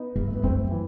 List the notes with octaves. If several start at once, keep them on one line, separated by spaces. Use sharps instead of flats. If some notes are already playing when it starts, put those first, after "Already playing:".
Already playing: B3 D#4
G2
A3
B3
F#2 A3 C4
E3